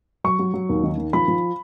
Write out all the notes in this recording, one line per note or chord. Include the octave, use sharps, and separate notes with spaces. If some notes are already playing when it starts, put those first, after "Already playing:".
F#3 C#6
F#3
F#3
D#2
D#3
D#3
F3 B5
F3